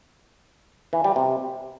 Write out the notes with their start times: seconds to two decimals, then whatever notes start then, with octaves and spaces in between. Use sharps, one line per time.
0.93 E3
1.04 G3
1.16 C3